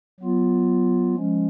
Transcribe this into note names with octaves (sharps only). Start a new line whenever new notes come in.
F#3 B3 F4
F3 G#3 C#4